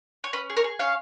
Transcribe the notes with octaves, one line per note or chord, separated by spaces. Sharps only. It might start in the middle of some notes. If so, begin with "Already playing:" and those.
C#5
C#4 B4
G#4
A#4 C#5
G#4
C#4 C#5 F5